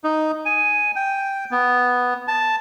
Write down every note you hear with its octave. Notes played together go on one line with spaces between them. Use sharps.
D#4
G#5
G5
B3
A5